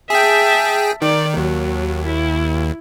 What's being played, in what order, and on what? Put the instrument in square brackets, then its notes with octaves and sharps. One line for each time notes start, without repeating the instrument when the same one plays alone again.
[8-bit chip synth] G#4 G5 [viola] E5 A5
[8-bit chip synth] D#3 [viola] D5
[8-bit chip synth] D#2 [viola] F#3
[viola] E4